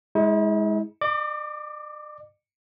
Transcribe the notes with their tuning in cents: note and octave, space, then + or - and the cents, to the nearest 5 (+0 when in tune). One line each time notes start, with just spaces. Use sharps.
G#3 +0 E4 -45
D5 +45 D6 +0